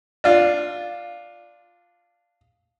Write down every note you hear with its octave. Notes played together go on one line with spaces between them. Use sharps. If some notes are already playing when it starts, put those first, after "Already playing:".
D4 F4